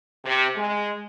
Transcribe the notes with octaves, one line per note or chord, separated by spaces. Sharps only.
C3
G#3